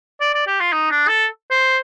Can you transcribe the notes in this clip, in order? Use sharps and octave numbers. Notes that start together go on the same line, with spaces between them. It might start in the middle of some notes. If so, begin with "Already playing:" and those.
D5
D5
G4
F4
D#4
D4
A4
C5